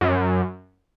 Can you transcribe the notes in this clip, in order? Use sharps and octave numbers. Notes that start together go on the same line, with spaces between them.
F#2